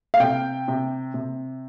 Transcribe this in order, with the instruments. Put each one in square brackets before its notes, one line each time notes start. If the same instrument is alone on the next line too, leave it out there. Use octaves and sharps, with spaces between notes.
[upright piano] F5
C3 G5
C3
C3